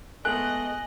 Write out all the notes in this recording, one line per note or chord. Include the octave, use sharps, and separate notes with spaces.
G#3 A3 B3 D#5 G#5 F#6 F#7